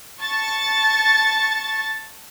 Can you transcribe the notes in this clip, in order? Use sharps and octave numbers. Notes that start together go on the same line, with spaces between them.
A5 C#6 A6